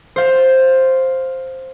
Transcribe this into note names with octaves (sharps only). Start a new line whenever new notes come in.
C5 F5